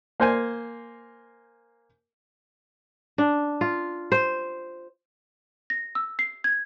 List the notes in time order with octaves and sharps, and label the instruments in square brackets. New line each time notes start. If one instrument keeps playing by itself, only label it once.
[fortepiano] A#3 C5 G#5
[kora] D4
F4
C5
[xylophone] A#6
E6
C7
G#6